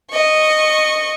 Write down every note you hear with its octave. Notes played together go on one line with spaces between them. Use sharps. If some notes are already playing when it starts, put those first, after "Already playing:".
D#5 C#6